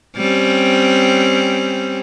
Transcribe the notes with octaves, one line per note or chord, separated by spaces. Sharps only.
G3 C4 C#4